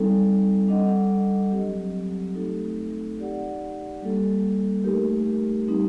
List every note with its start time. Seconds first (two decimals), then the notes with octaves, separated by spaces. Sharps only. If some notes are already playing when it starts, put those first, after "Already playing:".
Already playing: G3 C4 D#4 A4
0.67 G3 D4 A4 D#5 F#5
1.51 F#3 C4 G4
2.34 A3 C4 D#4 A4
3.19 D#4 G4 D5 F#5
4.02 G3 A#3 D4 A4
4.84 A3 D#4 G4 A#4
5.68 G3 C4 D#4